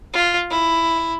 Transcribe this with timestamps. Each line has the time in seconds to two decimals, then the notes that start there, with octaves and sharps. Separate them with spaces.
0.13 F4
0.51 E4